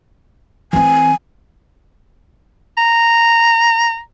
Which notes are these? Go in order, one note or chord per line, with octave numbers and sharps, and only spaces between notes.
E3 C4 G#5
A#5